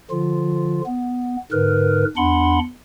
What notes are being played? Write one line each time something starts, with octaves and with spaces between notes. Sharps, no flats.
D3 F3 F4
B3
G#2 D3 A#4 B4
E2 D4 F#5 B5 C6